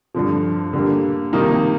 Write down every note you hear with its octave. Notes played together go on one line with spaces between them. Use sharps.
G2 D3 F3
D3 G3 A#3
C3 D#3 G3 A#3 D#4